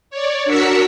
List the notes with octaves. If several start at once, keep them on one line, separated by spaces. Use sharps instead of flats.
C#5 D5
D4 F#4 A#4 E6 B6 C#7